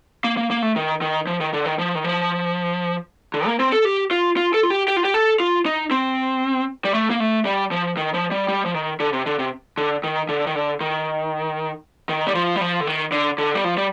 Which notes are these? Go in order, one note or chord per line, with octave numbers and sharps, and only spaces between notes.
A#3
A#3
A#3
A3
D#3
D#3
F3
D#3
D3
D#3
F3
D#3
F3
D3
A#3
C4
A4
G4
F4
F4
A4
F4
G4
G4
F4
G4
A4
F4
D#4
C4
G3
A3
A#3
A3
G3
F3
D#3
F3
G3
G3
F3
D#3
D3
C3
D3
C3
D3
D#3
D3
D#3
D3
D#3
D#3
G3
F3
G3
F3
D3
D#3
D3
D3
G3
F3
G3